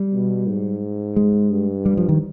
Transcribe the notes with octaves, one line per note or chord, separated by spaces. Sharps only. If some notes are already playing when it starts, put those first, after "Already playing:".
Already playing: G3
B2
G#2
G#3
G2
G3
F3
D#3